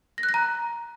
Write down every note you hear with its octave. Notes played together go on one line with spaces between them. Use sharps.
A#6
F#6
A#6
A#5